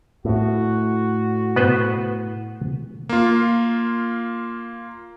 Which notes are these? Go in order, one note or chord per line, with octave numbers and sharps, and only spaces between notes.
A2 F#4
B3 B4 C5
A#3 F4